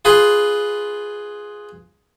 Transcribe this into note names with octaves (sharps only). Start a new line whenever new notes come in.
F4 G#4 B4 B5 C6